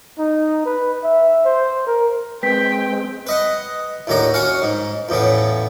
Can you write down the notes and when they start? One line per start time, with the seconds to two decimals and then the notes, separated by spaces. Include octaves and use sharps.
0.19 D#4
0.66 B4
1.04 E5
1.45 C5
1.87 A#4
2.43 G#3 C4 B4 G5 B6
3.27 B4 D#5 F#5
4.07 D#2 A2 D3 F#4 A#5
4.34 C#4 F#4 F5 F#5
4.62 G#2
5.09 E2 A2 C#3 B3